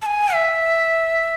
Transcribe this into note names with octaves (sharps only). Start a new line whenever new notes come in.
A5
G#5
E5